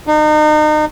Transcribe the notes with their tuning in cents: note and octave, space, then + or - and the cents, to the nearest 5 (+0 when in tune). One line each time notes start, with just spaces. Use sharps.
D#4 -35